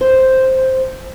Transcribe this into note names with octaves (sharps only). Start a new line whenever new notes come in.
C5